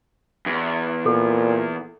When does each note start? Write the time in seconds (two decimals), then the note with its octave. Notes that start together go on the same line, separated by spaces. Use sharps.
0.46 E2
1.06 A#2 A4